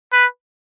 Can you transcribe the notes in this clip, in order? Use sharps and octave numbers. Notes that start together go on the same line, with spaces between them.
B4